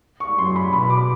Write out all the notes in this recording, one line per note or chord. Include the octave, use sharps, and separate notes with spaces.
C#6
F#2 C6
B5
B2 B5
D6